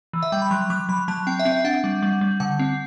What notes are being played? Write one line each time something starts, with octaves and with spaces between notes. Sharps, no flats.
E3
E5
G3 G5
B5
F#3 C6
F#3 D6
F#3 B5
F#3 A5
C4 G5
E5
C4
E5
D4 F#5
G3
G3
G3
D3 F#5
C4